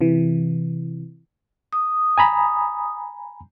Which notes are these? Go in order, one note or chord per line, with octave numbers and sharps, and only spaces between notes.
C3 E3
D#6
G#5 A#5 B5